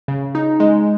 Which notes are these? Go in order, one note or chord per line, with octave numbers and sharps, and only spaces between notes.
C#3
D#4
G#3